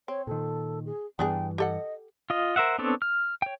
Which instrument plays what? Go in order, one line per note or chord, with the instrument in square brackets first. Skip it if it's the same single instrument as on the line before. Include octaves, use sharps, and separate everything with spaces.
[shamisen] C4 [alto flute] C#5
[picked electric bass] A#2 D#3 [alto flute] A4
[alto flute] G#4
[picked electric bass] G2 E3 [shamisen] B3 D4 G#4 [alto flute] G5
[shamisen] G4 A4 F#5 [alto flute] D#5
[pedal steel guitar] F4 D#5
A#4 C5 E5 F#5
B3 C4 D4 A4 C#5
F6
C#5 G5